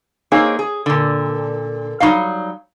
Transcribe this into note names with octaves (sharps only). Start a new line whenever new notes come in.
A#3 C4 D#4 G#4 C#5
G#4
A#2 D3
F#3 G3 B3 D#4 D#5 F5